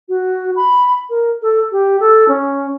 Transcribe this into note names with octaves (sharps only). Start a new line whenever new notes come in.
F#4
B5
A#4
A4
G4
A4
C#4